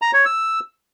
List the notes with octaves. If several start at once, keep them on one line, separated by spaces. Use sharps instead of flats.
A#5
C#5
E6